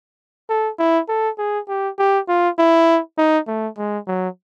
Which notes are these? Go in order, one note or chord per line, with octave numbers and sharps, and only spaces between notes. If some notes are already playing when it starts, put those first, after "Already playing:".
A4
E4
A4
G#4
G4
G4
F4
E4
D#4
A3
G#3
F#3